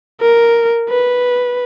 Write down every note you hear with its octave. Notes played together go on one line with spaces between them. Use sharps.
A#4
B4